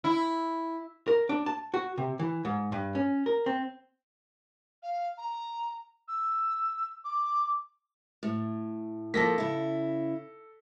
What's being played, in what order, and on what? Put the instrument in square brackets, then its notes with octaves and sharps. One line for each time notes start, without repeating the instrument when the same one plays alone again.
[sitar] E4
[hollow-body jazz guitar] A#4
D4
A5
F#4
C3
E3
G#2
G2
C#4
A#4
C4
[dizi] F5
A#5
E6
D6
[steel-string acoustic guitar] A2
[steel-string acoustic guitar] F3 A#3 [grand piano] A4 A#6 B6
[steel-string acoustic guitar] C#3 E4